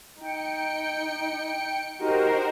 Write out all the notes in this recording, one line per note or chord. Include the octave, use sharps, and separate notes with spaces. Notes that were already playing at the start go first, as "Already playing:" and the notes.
D#4 G5 C#7
D#4 F#4 G4 A#4 C5